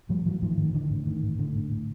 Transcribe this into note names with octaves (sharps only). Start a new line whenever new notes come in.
A2 F3 G3
A2 E3 F#3
A2 D#3 F3
A2 D#3
A2 D3 E3
A2
A2 D#3
A2
A2 D3
A2
A2